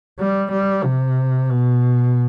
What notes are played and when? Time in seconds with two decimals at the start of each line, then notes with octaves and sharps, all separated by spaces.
0.19 G3
0.52 G3
0.85 C3
1.50 B2